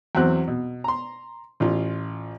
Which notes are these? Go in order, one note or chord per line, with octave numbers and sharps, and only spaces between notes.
E2 F#3 C4 F#6
B2
A#5 C6
A1 F4